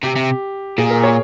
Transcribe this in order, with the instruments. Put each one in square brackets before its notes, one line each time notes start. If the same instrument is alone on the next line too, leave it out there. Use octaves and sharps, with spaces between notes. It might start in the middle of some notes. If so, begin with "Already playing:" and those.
[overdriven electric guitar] C3 [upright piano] G4
[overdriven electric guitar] C3
[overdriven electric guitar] A#2 [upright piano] G#4
[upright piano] A#4
C#5